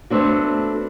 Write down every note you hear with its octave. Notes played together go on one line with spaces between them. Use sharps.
A3 B3 C4 D4 F#4